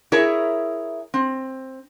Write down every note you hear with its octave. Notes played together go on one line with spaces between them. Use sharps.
E4 G#4 A#4 C#5 E5
C4